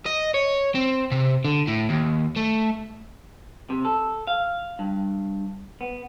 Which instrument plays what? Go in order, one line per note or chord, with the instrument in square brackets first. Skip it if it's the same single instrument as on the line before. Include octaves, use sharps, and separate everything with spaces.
[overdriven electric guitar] D#5
C#5
C4
C3
D3
A2
D#2
A3
[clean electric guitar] C3
A4
F5
G2
B3